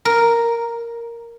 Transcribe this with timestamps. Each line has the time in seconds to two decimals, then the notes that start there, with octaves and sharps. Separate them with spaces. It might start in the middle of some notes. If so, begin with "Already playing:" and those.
0.05 A#4